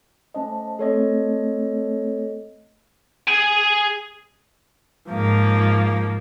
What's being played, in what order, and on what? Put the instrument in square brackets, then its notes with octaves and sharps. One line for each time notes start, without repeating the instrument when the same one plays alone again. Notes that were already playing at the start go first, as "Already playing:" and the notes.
[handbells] A3 C#4 D#5 [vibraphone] C5 A5
[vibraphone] A3 C4 [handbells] A4 C#5 D#5
[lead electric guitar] G#4 G#5
[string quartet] G#2 F3 A#3